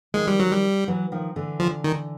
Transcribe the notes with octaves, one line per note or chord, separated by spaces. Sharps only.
D#3 F3 G#3
G3
F#3
G3
E3 F#3
D#3 F3
D3 E3
F3
D#3